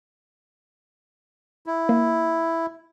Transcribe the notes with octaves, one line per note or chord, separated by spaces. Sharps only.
E4
A#3